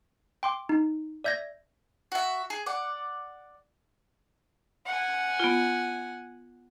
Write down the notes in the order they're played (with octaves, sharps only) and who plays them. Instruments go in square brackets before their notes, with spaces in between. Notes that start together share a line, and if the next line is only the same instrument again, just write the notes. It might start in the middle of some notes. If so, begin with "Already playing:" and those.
[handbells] G5 C6 D6
D#4
D5 E5 G6 G#6 A#6
[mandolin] F#4 E5
G#4
D5 F#5
[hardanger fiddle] F#5 G#5
[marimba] B3 F4